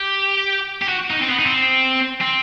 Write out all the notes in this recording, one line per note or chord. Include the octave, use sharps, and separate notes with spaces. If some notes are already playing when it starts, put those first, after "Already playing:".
Already playing: G4
G4
F#4
D#4
C4
B3
D#4
C4
C4